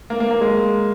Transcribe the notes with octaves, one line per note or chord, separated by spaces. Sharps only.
A#3
A#3
A#3
G#3